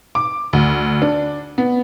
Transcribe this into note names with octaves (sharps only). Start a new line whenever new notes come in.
D6
D2
D4
B3